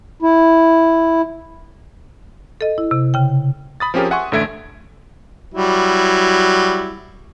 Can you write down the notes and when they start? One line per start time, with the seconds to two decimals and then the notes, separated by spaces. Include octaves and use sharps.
0.22 E4
2.61 A4 D#5
2.78 E4
2.91 C3
3.14 C#3 G5
3.80 B5 D#6 A6
3.94 F3 C4 C#4 G4 G#4 A#4
4.10 E5 F#5 G#5 C6 C#6
4.32 A1 D3 A3 E5 G#6 D7
5.54 F#3 G3 E4